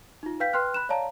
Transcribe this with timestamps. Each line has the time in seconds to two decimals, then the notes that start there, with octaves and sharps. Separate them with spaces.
0.23 D#4 F4
0.40 B4 F5 G5 G6 B6
0.53 B4 G5 C6 F6 F#6
0.74 B5 F#6 E7
0.89 C#5 D5 F5 A5 A#5